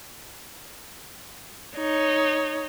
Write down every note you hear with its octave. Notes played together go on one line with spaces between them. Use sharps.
D#4 C#5